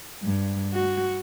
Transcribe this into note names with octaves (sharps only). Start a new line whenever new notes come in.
G2
F#4